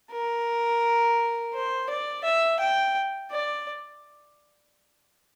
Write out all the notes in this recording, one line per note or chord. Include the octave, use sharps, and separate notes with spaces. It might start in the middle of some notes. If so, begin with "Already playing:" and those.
A#4
C5
D5
E5
G5
D5